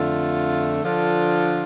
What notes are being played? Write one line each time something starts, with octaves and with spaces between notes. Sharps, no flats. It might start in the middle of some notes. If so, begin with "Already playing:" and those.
Already playing: F2 D3 A3 F4 A4
D3 F3 D4 F4 A4